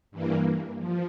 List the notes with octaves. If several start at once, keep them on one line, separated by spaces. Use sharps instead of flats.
G2 E3 A#3
F3